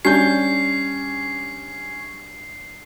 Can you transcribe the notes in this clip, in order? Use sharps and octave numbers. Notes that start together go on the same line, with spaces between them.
G3 C#4 D4 G6 C7